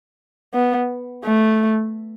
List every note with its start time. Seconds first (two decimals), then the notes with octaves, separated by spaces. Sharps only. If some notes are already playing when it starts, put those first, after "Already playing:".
0.54 B3
1.25 A3